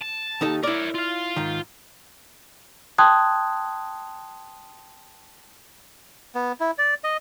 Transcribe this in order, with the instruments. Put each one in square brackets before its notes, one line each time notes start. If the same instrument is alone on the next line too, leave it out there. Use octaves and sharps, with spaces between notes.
[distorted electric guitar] A5
[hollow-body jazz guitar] D#2 D#4 A4
[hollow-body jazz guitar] E4 D5 [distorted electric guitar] A#4 C#5
[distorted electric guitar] F4 F5
[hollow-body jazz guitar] G#2 D#3
[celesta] G5 A5 C6 D#6 F#6 G#6
[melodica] B3
E4
D5
D#5